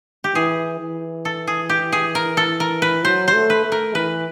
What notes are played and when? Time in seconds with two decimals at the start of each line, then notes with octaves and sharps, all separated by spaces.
0.24 G4
0.35 E3 G#4
0.80 E3
1.25 A4
1.47 G#4
1.69 G4
1.92 G#4
2.15 A#4
2.37 A4
2.60 A#4
2.82 B4
3.05 F#3 C5
3.28 C5
3.34 A3
3.50 B4
3.65 A3
3.72 A#4
3.95 E3 B4